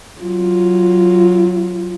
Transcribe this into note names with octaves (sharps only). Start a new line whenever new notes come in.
F#3 F4